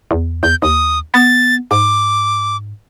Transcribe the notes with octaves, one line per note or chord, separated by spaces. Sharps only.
E2
E2 G6
D#2 D#6
B3 A6
G#2 D6